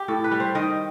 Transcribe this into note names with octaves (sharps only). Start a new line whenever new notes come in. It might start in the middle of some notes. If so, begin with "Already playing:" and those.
Already playing: G4
A2 A4
B4
G3
C5
D#3 D#5